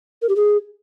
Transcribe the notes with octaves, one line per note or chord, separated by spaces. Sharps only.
A#4
G4
G#4